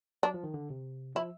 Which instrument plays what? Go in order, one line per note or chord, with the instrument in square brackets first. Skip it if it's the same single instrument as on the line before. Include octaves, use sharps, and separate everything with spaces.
[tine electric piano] F#3 [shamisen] D4
[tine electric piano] F3
D#3
D3
C3
[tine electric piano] F3 [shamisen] E4